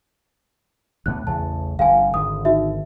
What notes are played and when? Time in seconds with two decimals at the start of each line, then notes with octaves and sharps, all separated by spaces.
1.06 D2 A2 B3 F#6
1.27 A1 E2 C#3 A5
1.79 G1 F2 D3 F5 G#5
2.14 G#1 D3 D#6
2.45 D#4 F#4 E5